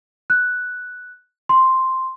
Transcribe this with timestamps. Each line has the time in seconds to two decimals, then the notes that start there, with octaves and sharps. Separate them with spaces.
0.30 F#6
1.49 C6